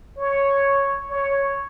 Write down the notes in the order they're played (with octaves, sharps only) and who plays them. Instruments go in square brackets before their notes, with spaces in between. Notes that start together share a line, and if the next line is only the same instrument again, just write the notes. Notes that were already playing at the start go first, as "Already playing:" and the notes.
[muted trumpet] C#5
C#5